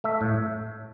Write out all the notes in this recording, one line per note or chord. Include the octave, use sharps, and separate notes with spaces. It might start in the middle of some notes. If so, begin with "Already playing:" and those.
A3 E5
A2